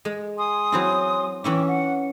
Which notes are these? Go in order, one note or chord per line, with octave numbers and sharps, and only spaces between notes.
G#3
G#5 C6 D#6
F#3 C4 E4
E3 C#4 E4 G5 D6
F#5